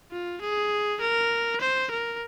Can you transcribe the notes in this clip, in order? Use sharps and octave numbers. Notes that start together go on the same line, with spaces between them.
F4
G#4
A#4
C5
A#4